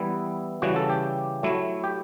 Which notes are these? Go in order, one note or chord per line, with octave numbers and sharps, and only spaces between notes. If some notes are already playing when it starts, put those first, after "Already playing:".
Already playing: E3 G3 B3 E4 E5
C#3 E3 G3 F#4
A4
G4
F#3 A3 E4
G4